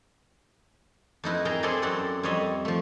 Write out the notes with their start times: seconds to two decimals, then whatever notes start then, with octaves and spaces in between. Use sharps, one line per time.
1.24 F2 D#4 E4 B4
1.45 G#4 A#4 G5 A5 A#5
1.63 C4 E4 G#4 A4 D5 G5
1.82 F#2 C4 A4 A#4 D5 F#5
2.23 F2 G3 C4 C#5 D#5 E5
2.65 F3 A3